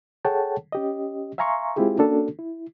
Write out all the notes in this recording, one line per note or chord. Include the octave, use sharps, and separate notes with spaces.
G#4 A4 C#5 F#5 G5 A5
C#4 G4 D#5
E5 F5 G#5 A#5 C6 C#6
G#3 C4 E4 F4 G4 G#4
A#3 C#4 D4 F#4 A4
E4